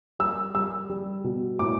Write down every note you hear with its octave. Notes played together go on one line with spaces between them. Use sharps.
G3 E6
G3 E6
G3
B2
A2 D6